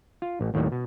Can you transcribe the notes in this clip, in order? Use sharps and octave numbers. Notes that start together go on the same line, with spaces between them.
F4
A1
D#2 A2 D#3 F#3 G3
B2